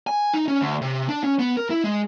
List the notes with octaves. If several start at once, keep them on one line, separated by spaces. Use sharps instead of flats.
G#5
D#4
C#4
D2
C3
D4
C#4
B3
A#4
E4
G#3